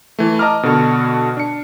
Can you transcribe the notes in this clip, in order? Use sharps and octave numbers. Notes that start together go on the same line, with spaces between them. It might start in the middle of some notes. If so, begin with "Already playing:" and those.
E3 A3
D#5 A5 A#5 D6 F6
B2 D3 F#4 A4
D4 C#7